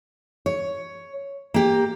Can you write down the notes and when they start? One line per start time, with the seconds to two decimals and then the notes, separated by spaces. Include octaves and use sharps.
0.46 C#5
1.54 A#3 G4